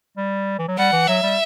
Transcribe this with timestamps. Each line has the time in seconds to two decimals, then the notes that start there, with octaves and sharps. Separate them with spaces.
0.17 G3
0.59 E3
0.68 F#3
0.78 G3 F#5
0.93 E3
1.08 F#3 E5
1.23 G3